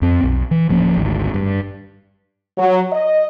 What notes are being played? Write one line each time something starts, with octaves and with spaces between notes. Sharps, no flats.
F2 C4
B1
E3
D1 F3 A#3 C#4
G#1 D2
G2
F#3
D#5